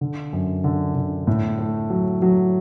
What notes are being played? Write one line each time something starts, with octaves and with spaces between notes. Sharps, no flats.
D3
F#2
D3
D3
A2
A3
F#3
F#3